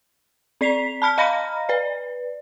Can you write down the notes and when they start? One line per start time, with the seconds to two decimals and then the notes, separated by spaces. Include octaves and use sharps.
0.61 C4 D5 B6 C7 F7
1.02 A5 B5 F6 B6
1.18 D#5 F5 A#5 B5 F6 A#6
1.69 B4 D5